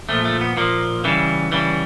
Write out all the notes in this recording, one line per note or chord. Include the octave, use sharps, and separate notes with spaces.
A#2 F3 A3
A3
B3
A#2 F3 A#3
C#3 E3 G3
C#3 E3 G3